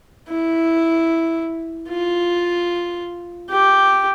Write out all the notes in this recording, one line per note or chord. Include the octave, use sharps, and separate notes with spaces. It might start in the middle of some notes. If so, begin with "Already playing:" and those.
E4
F4
G4